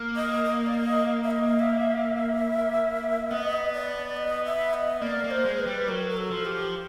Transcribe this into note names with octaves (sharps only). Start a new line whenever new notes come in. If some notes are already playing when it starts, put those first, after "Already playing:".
Already playing: A#3
D#5
D#5
D5
D#5
E5
D#5
E5
B3 D#5
D5
D#5
E5
D#5
A#3 D5
A#3
C5
G#3
B4
G3
F#3 A#4
A#4
A4
F3
G4